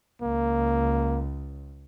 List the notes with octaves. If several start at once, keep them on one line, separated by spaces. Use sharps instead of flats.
C#2 A#3